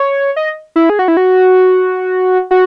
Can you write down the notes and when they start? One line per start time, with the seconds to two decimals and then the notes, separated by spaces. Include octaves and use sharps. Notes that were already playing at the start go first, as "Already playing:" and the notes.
Already playing: C#5
0.36 D#5
0.76 E4
0.90 G#4
0.99 F#4
1.08 E4
1.17 F#4
2.51 F#4